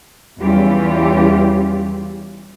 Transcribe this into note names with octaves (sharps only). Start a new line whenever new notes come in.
E2 E3 G3 C#4 F4 G4